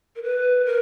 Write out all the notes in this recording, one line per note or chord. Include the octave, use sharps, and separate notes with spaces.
A#4
B4
A#4